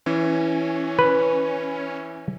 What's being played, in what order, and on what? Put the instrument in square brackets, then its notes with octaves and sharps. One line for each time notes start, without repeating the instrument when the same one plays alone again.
[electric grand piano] E3 [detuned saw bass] C#4
[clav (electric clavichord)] B4